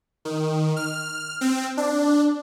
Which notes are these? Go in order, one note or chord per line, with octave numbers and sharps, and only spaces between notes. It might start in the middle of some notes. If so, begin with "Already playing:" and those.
D#3
F6
C4
D4